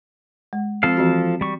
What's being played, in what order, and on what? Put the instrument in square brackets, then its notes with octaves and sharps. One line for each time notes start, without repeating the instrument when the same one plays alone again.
[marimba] G#3
[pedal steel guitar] F3 A4 F5 [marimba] C4
[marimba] E3 C4 F#4
[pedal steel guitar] G3 C#6